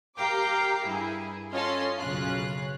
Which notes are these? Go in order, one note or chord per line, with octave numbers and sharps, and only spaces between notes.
G4 A#4 F5 G5 A#5 D6
G2 E4 G#4
C#4 F4 A4 C#5 D#5 C6
B1 F#2 C#3 C#4 F4 F#6